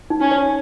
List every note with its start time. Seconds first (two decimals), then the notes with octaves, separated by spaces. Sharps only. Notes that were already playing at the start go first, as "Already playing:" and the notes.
0.10 D#4
0.21 C#4
0.31 C#5